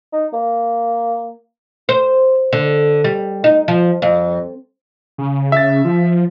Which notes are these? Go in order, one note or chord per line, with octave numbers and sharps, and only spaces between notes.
D#4
A#3
C5
D3
G3
D#4
F3
F2
C#3
E5 A6
F3